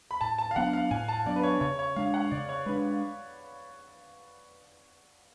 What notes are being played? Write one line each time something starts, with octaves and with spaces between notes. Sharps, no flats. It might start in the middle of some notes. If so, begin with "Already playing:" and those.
B5
A2 A5
A5
F5
F#3 B3 D4 F#5
F5
A2 G#5
A5
F#3 B3 D4 D5
B4
C#5
C#3 C#5
C#5
G#3 D4 F5
F#5
C#3 D5
C#5
G#3 D4 B4